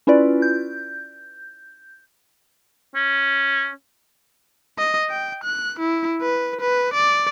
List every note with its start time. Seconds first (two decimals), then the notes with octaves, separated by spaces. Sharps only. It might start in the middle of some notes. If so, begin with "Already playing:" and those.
0.07 C#4 E4 F4 B4 D5
0.42 G6
2.95 C#4
4.79 D#5
5.10 G5
5.44 F#6
5.79 E4
6.22 B4
6.61 B4
6.94 D5